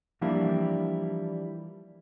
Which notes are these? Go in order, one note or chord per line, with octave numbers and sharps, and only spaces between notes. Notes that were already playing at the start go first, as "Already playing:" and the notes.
E3 F3 G3 A#3 D4 E4